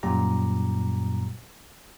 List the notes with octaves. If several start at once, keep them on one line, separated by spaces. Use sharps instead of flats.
F#2 A#2 G3 G4 A#5